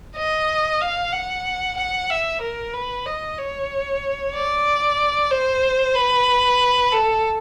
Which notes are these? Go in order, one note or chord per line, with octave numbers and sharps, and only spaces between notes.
D#5
F5
F#5
F#5
E5
A#4
B4
D#5
C#5
D5
C5
B4
A4